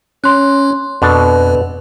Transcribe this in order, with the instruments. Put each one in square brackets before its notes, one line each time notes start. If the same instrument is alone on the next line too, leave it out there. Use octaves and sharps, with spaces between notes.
[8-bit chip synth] C#4 [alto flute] C#5 [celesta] C6 F#6
[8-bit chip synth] F2 [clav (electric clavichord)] B2 D4 A4 [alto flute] B4